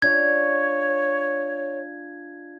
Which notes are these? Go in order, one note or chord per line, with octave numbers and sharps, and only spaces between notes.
D4 F4 C#5 D#5 G#6